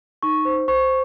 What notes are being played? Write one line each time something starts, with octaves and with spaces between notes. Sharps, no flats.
D#4 C#6
C5
C5 C#6